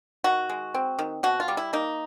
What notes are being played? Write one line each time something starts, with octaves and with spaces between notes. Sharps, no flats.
D#3 F#4
G#3
C4
D#3
B2 F#4
F4
G3
E4
A#3 D#4